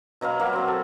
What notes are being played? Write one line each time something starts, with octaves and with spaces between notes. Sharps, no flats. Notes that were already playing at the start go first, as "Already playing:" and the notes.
B2 F#3 B4 F5
F#3 A#3
F#3 C4
A4